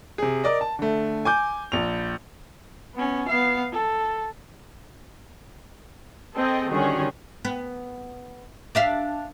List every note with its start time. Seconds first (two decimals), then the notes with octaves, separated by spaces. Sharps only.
0.18 C3 G#4
0.44 A#4 D5 D#5
0.61 A5
0.79 D3 A3
1.25 G#5 D6 G6
1.72 A#1 F7
2.95 B3 C#4
3.28 B3 F5
3.72 A4
6.36 C4 G#4 A4 D#5 G5
6.70 D3 D#3 G3 C#4 F#4 G#4
7.45 B3
8.75 D4 E5 F5